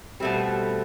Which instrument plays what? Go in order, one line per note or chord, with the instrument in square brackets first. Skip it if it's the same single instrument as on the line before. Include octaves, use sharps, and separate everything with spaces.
[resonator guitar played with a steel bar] B2 A3 C4 [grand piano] G3